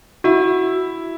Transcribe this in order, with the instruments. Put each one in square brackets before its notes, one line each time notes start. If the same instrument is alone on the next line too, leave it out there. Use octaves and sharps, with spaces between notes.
[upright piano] E4 [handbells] F#4